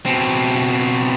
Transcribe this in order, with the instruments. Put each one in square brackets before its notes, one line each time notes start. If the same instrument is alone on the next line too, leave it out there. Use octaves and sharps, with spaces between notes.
[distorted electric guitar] B2 C4